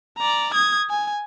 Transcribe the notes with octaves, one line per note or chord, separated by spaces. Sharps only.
D5 A#5
D#6 G#6
G#5